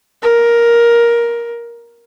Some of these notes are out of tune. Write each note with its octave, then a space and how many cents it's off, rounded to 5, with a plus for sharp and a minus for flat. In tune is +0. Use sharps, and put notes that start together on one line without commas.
A#4 +10